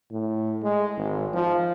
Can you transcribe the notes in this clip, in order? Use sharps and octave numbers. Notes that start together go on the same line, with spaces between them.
A2
G#3
G#1
F3